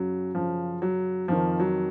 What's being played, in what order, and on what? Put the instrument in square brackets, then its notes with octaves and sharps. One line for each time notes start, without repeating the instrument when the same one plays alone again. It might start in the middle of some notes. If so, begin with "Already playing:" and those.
Already playing: [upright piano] F#2 C#3 F#3
F#2 C#3 F3
F#3
F2 D#3 F3
F#3